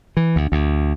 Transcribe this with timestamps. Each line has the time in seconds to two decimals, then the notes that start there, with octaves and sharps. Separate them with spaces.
0.17 E3
0.36 D2
0.52 D2